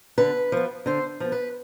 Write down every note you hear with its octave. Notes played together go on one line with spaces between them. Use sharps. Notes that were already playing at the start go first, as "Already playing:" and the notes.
D3 B4
F3 B3
D3 C5
F3 B3
B4